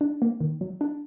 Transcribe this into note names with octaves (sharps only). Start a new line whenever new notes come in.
D4
A#3
D#3
F#3
D4